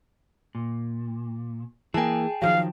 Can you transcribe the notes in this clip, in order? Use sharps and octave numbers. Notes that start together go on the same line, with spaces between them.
A#2
E3 A#3 G#4 G5 A5
D#3 F3 F#3 F5